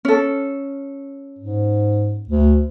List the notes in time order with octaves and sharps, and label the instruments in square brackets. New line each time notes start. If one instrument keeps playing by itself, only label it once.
[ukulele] C#4 A4
[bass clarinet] G#2
D2